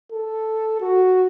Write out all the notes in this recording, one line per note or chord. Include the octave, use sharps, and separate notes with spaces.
A4
F#4